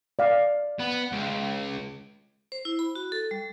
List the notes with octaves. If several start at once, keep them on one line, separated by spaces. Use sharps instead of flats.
D5 F5
B3
C#2
C5
E4
B5
F#4
A4
G3